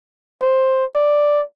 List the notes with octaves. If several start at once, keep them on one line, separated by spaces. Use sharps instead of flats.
C5
D5